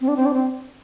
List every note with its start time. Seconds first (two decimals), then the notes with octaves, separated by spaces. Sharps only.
0.01 C4
0.08 D4
0.16 C4
0.26 D4
0.34 C4